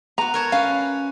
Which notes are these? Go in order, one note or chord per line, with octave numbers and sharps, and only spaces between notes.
B3 F#4 A#5
A#4 C#5 A5
C#4 B4 F5